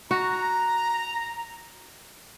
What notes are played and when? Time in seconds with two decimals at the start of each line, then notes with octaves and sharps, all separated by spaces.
0.11 F#4 A#5